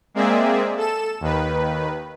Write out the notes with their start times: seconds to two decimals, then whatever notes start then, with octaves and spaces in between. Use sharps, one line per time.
0.14 G#3 A#3 C4 G#4 D5 E5
0.77 A4 E7
1.20 D#2 D#3 B4